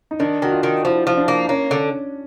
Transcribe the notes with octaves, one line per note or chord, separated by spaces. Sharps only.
D#4
D#3 D4
D#3 F#4
F4
D#3
F3 E4
F3
D4
A#3
A#3 C#4
D3